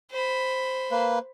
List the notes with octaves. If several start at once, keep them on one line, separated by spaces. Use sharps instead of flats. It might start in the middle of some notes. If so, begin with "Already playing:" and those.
C5 B5
A#3 B4